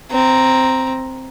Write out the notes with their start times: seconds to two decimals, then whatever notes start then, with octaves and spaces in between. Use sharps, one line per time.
0.11 C4 A#5